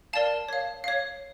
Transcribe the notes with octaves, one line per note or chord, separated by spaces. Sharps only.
A#4 D5 F5 A5
C#5 F5
C#5 F5